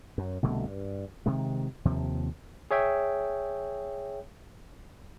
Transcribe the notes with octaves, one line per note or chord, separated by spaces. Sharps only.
F#2
C2 B2 D3 A3
G2
C3 D#3 G#3
D#2 C3 F3
G#4 C#5 E5 G5